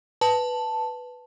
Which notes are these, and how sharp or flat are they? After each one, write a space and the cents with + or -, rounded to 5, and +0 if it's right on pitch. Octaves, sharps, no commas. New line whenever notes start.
B4 +0 A5 +0